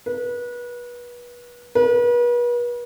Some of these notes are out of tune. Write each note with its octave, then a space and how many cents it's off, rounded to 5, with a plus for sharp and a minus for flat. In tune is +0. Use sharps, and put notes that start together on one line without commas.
B4 -30
B4 -40